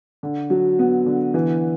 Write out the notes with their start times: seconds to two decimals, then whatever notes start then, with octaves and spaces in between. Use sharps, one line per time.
0.23 D3
0.50 F#3
0.79 B3
1.06 D3
1.34 E3